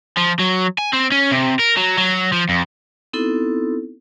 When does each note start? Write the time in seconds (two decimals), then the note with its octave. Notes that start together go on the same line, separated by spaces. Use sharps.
0.18 F3
0.40 F#3
0.78 G#5
0.93 C4
1.12 C#4
1.31 C3
1.60 A#4
1.77 F#3
1.98 F#3
2.32 F3
2.49 F2
3.13 B3 C4 D#4 E4 F#4 A4